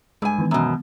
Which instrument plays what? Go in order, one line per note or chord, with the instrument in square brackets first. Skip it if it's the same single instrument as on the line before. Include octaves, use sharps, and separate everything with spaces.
[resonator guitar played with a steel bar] G2 G#5 [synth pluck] G#3
[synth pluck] D#3 E3 B3
[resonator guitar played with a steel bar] F#2 B2